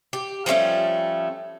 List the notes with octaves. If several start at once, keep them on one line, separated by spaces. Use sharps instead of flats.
G4
F3 G3 A3 C#4